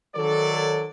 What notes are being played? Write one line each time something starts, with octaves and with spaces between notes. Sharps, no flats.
D#3 F#3 A4 D5